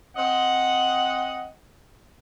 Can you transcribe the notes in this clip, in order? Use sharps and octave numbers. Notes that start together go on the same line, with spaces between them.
C4 D#5 F#5